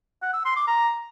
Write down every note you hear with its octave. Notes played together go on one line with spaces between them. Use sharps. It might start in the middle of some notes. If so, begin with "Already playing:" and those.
F#5
E6
C6
D6
A#5